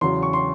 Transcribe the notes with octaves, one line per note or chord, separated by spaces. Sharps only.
E2 C#3 F#3 C6
C#6
C6